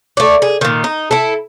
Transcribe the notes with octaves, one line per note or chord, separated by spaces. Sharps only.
A3 D5
G#4
A#2 D#3
D#4
E4 A4